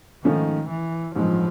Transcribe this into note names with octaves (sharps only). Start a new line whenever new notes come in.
G#2 D#3 F3 A3 C#4
E3
A1 G2 D#3 F3 G#3